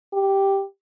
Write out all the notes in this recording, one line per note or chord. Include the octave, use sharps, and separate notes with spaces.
G4